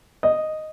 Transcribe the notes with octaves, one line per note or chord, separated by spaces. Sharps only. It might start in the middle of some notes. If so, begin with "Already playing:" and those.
D#5